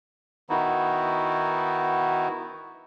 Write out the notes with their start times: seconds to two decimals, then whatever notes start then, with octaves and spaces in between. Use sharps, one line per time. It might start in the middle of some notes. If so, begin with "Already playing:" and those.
0.50 D#3 B3 D#4 E4 F#4